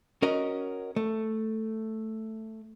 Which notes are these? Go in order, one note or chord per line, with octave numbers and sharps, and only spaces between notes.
C#4 F#4 A#4 D#5
A3